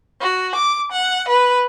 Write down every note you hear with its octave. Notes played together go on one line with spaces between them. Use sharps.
F#4
D6
F#5
B4